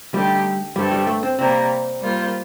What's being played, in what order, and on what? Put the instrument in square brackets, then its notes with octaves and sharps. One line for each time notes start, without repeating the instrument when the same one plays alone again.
[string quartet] D3 A3 D#4 G4 [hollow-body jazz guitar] G3
[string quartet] G2 D3 A3 C4 [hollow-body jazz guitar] G3
[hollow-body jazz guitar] G3
A3
C4
[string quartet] C3 G3 A#3 [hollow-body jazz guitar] C4
[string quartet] G3 A#3 F4 C5